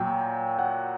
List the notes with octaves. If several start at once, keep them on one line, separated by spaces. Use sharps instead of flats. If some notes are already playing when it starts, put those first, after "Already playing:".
Already playing: A#2 F#3 G5
F#5